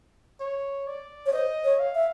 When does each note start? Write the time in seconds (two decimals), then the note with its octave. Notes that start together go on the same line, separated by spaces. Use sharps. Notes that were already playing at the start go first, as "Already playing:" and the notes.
0.40 C#5
0.87 D5
1.26 C#5
1.33 C5 D#5
1.64 C#5
1.79 F5
1.95 E5